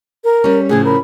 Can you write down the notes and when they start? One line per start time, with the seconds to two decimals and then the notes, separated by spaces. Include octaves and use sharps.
0.24 A#4
0.44 G3 C#4
0.69 A2 C#3 F3 G#4
0.85 A#4 B5